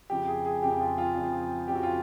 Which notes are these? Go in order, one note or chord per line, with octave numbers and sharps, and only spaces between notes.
F2 C#3 F3 G4
G#4
G#4
F2 C#3 F3 G4
F4
F4
F2 C#3 F3
F2 C#3 F3 G4
F#4
F4